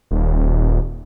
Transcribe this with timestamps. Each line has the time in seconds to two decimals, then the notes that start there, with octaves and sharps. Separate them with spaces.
0.11 D#1